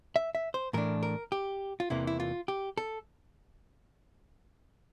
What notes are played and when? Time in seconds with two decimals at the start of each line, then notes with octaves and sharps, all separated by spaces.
0.16 E5
0.35 E5
0.54 C5
0.73 A2 E3 A3 D4 A#4
1.03 A#4
1.32 G4
1.80 F4
1.90 E2 C3 E3 A#3 E4
2.07 E4
2.20 F4
2.48 G4
2.78 A4